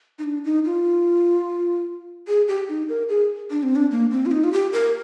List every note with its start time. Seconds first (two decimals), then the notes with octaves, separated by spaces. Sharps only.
0.19 D#4
0.24 D4
0.45 D#4
0.65 F4
2.28 G#4
2.48 G4
2.69 D#4
2.89 A#4
3.09 G#4
3.50 D4
3.63 C4
3.76 D4
3.91 A#3
4.11 C4
4.26 F4
4.31 D#4
4.44 F4
4.53 G4
4.73 A#4